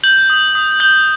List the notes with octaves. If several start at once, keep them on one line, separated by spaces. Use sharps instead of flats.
G6 F#7
D#6
D#6
G6 G7